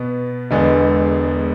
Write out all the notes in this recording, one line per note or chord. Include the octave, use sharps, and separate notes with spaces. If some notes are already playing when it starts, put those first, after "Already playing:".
Already playing: B2 B3
E1 E2 D3 G#3 B3